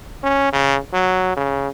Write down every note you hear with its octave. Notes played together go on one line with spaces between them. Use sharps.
C#4
C#3
F#3
C#3